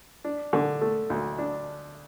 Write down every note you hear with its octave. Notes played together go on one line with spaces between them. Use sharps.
D4
D3
A3
D2
D4